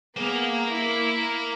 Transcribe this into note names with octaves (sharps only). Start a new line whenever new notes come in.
A#3 B3 G#4 F5
E4